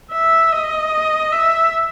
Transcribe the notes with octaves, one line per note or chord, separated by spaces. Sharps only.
E5
D#5
E5